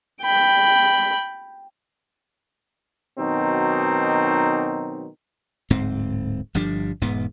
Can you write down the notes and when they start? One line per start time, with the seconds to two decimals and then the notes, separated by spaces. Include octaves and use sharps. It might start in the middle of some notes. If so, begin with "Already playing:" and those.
0.22 G5 B5
3.19 B2 D#3 F#3 C4 D#4
5.70 D1 G#2 C4
6.55 G1 F3 G3 D4
7.01 E1 G#2 B3